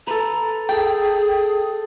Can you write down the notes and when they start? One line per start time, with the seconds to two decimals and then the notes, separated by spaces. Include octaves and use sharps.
0.07 A4 B4 A#5
0.69 G#4 A4 G5